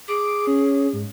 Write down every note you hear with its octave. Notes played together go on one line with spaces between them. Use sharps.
G#4 D6
C#4
G#2